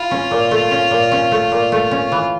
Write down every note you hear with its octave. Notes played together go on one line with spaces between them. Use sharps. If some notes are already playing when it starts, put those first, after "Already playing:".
Already playing: E4 F4
C#4
A#2
A3
C#4
A#2
C#4
A3
A#2
A3
C#4
E3